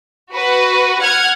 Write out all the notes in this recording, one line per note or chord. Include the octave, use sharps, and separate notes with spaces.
F#4 B4
F#5 F6 G#6